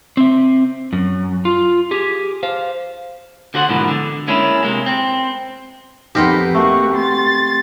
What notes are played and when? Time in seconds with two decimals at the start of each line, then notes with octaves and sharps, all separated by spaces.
0.17 C4 E5
0.93 F#2
1.45 F4
1.91 G4 G#4
2.43 C5 F5
3.54 D3 F#4 C5 F#5
3.69 G#2 B2 E3 F3 G#3 A#3
3.88 D3
4.27 G#3 A#3 C#4 D4 E4
4.63 C3 G#3 A#3
4.86 C4
6.15 F2 B3 C4 D#4 G4 A#4 D#5
6.54 A3 A#3 F#4
6.95 C6 A6